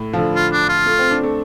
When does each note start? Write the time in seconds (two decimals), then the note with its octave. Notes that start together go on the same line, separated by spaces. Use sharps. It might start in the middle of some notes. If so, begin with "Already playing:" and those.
Already playing: A2
0.13 F3
0.18 D3
0.35 F4
0.52 D4
0.69 F4
0.86 A3
0.99 C4
1.11 D4
1.23 A3